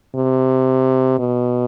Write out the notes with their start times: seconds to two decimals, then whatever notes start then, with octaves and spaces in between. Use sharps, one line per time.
0.16 C3
1.19 B2